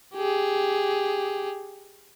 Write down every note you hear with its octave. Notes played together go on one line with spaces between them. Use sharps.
G4 G#4